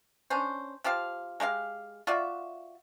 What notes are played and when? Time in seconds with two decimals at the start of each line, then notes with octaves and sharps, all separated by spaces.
0.30 C#4 D4 C5
0.84 F3 G4 C5 F5
1.40 G#3 A3 G4 F5
2.07 F4 F#4 D5 E5